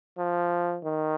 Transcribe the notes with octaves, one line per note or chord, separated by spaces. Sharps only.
F3
D#3